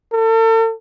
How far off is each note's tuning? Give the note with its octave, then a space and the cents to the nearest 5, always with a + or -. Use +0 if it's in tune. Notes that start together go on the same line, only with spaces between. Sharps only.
A4 +40